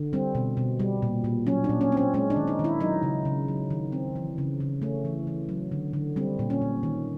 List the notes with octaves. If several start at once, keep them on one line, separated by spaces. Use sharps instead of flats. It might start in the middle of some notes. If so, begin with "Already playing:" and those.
Already playing: D3
G3 C4
B2
B2
G3
A#2
A#2
F#3 C#4
D4
A#2
C#4
C4 C#4
G#3 C#4
D4
D#3
D#4
D#3
E4
F#3 D#4
C#3
C#3
F#3
D#3
C4
E3
C#3
C#3
A3 C#4
E3
E3
F#3
D3
D3
G3 C4
A#2
C#4
A#2
D#3